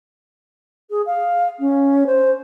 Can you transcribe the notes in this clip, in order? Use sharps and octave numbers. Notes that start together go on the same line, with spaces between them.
G#4
F5
C#4
C5